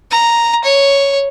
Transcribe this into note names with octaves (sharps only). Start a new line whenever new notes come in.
A#5
C#5